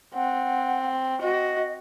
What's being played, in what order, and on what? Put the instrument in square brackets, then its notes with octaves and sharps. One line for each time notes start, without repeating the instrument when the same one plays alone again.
[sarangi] C4 [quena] F#5
[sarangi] F#4 [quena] D#5